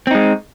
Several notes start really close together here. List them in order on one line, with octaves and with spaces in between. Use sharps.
C4 D#4 G#3